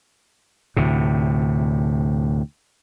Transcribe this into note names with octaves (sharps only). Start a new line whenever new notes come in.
D2 A2 C3